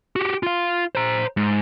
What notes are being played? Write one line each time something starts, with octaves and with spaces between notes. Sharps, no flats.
F#4 G4
F4 F5
C5 A#5
G#2